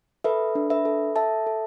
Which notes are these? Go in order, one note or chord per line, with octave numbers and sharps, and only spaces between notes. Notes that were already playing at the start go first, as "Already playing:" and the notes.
A4 B4 E5
D4
B4 E5
A4
A4 E5 A5
A4